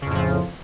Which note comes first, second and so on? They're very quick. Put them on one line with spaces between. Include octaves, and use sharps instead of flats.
C#3 F2 A2 F3